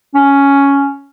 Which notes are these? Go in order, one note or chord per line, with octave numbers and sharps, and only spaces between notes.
C#4